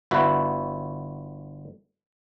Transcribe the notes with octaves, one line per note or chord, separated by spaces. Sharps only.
G1 E4 F#4 B4